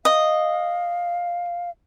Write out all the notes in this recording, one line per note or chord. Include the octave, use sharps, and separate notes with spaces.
D#5 F5